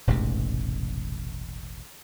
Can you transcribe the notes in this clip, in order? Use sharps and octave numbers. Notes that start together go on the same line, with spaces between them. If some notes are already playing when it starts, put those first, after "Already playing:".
E1 A1 G#2 C3